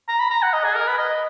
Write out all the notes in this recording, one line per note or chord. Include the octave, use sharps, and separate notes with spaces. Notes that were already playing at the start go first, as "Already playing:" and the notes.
A#5
B5
A#5
F#5
D#5
G#4
A#4
B4
D#5